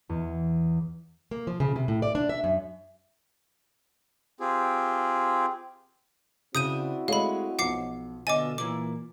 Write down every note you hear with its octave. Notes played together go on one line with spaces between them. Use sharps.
E2
A#3
F3
C#3
C3
A2
D5
D4
E5
F#2
C4 F4 G4 G#4
C#3 C4 D4 E4 F#4 D#6 G6 D#7
G#3 A3 C#5 D#5 F5 B5
B1 F3 F#5 D6 C7
B2 D3 F4 D#5 E5 G#5 D6 A6
A#2 E3 A#3 E4 D6